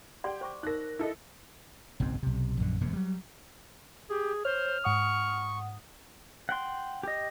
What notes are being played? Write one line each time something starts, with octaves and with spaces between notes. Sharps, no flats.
G4 D5 F#5 G5 C6
C5 C#6 D6
D#4 A#4 F#6 A#6
E4 A4 D#5
F#1 B1 G#2 C4
B1 C3
A#1 F#2 D3
E1 F#2 C3 A#3
F#3 G3
G4 G#4
C5 C#5 F6
G#2 F#5 C#6 D#6
F#5 G5 C6
G4 D#5